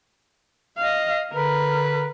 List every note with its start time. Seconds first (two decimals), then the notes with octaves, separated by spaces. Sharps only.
0.77 D#5 F5
1.33 D3 A#4 B4